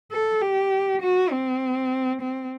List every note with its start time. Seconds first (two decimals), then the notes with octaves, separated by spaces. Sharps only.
0.12 A4
0.41 G4
1.02 F#4
1.32 C4
2.21 C4